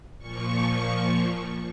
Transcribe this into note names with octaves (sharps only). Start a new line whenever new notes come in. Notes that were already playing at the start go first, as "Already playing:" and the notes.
A#2 F3 C#6